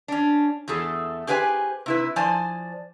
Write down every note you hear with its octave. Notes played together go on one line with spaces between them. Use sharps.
C#4 D4
E2 A3 G#4 A4
G4 G#4 B4 C5 D#5 G#5
C3 E4 B4
F3 C5 D5 G#5 A5